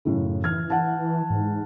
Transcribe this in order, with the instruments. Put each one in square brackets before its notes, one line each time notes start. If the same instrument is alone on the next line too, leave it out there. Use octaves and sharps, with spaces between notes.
[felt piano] F#2 A2 C#3
[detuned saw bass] E3 [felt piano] F6 G#6
[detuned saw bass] E3 [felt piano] F#5 A5
[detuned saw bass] G#2